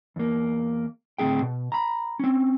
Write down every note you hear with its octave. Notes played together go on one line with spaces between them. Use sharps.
E2 A#3
D2 A2 C#3 C4 G#4 G5
B2
A#5 B5
C4 C#4